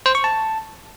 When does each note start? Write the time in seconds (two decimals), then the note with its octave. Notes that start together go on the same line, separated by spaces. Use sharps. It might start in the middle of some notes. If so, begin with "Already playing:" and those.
0.06 C5
0.15 C#6
0.24 A5